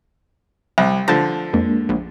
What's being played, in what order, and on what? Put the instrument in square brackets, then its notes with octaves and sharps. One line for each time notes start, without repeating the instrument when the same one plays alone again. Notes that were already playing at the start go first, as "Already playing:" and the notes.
[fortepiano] C2
[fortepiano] D3 F3 [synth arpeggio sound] A5
[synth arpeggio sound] F2 [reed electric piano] G#3 A#3 D4
[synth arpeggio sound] A#1